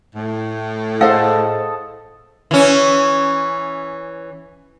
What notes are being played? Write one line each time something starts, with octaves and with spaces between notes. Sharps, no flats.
A2
G#4 A4 C5 D#5 F5 F#5 A5
E3 C#4